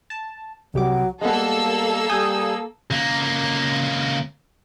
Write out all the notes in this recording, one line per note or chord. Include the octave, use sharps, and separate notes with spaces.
A5
C2 F#3 G4 D6
G3 G#3 A#3 B3 A4 E6
G3 G#5 D#6 G6
C#2 A#3